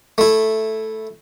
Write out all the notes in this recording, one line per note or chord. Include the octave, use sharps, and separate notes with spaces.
A3 E4